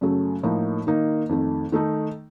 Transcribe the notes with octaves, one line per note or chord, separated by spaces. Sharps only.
F#2 C#3 F#3 A3
A2 F3 A#3 D#4
D#3 A#3 D#4
F2 D#3 A3
D#3 A3 D#4